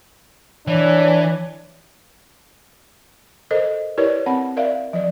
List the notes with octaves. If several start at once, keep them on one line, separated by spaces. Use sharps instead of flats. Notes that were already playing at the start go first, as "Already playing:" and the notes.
E3 D4 C#5
A4 A#4 C5 D#5
E4 G4 A#4 B4 C#5 D5
C4 F#5 B5
A#4 D5 E5 F5
F3 D5